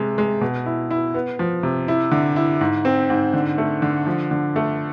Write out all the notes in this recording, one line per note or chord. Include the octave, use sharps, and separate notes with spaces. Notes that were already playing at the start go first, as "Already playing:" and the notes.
Already playing: C3 G#3
G#3
B2
E4
E4
B3
F3
C3
E4
D3
E4
G#2
C4
G#2
D3
A3
D3
F3
D3
A3